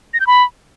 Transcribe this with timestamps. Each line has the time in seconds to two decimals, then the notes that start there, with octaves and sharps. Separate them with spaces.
0.14 A#6
0.20 G6
0.27 B5